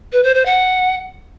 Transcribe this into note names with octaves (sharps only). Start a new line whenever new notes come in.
B4
C5
C5
F#5